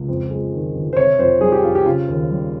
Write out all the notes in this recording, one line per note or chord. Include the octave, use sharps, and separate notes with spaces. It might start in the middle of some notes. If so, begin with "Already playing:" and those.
Already playing: C#2
F2
G#3
D#3
G1
C5
C3 C#5
F2 C5
G3 G#4
G4
F2 F4
G4
C#3 F4
D#2
G3